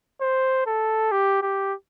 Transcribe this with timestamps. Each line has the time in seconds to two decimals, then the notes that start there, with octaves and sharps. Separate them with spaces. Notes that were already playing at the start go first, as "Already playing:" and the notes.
0.21 C5
0.66 A4
1.12 G4
1.42 G4